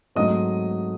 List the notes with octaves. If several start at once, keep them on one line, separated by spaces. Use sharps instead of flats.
G#2 F#3 A3 C4 D#5 D#6